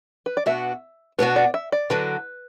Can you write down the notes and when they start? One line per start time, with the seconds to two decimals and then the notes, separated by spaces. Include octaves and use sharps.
0.26 B4
0.37 D5
0.46 B2 B3 D4 F#4 E5
1.19 B2 B3 D4 F#4 B4
1.36 D5
1.54 E5
1.72 D5
1.90 D3 F#3 D4 F#4 B4